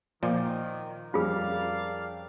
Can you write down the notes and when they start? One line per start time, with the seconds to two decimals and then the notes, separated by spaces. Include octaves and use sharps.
0.23 A#2 D#3 F3 D5 F5 D6
1.14 F2 G3 C#4 F4 G#4 A#4 D5 F5